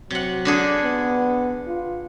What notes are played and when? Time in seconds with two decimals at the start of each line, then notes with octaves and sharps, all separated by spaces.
0.10 C3 F#3 F#5
0.45 D3 D4 G#4
0.83 B3
1.67 F4